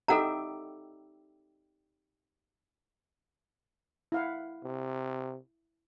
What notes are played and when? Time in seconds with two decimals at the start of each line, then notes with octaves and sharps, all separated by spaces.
0.08 D#4 G4 A4 E5 F#5 A#5
4.12 E4 F5 F#5
4.64 C3